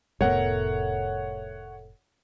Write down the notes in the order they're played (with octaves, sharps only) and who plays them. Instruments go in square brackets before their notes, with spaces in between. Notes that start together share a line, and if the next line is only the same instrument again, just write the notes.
[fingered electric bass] F1 A2 B3 [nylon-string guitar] A3 A#4 [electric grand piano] C#5 F#5